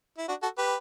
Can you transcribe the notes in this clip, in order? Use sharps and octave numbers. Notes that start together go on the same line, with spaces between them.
E4
D4 F#4
F#4 A4
G4 B4